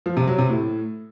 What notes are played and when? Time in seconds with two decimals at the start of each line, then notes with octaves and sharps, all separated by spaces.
0.06 F3
0.17 C3
0.28 F#3
0.38 C3
0.49 A2